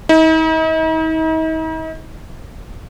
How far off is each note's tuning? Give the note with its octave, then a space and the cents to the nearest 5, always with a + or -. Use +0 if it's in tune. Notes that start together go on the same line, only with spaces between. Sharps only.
D#4 +45